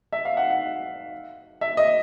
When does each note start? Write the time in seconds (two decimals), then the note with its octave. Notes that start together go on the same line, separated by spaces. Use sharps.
0.13 E5
0.25 F5
0.37 F#5
0.50 F#5
1.61 E5
1.77 D#5